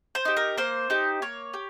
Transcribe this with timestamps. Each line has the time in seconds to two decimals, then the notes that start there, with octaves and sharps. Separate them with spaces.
0.15 C5
0.25 D#4 G4
0.37 A#4
0.58 A#3 C5
0.90 D#4 G4
1.22 A#3 C#5
1.54 G4